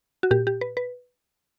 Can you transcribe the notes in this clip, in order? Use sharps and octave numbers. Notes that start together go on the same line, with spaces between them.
F#4
A#2 G4
G4
B4
B4